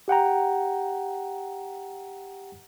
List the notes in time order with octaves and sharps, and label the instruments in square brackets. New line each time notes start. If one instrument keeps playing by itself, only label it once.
[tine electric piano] G4 F#5 G5 A#5